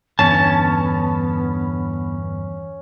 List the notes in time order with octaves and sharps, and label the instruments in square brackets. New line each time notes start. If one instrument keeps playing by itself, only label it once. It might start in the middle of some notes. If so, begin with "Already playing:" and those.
[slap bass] E2 G2 D3 [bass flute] B3 [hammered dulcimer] C#4 [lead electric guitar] A5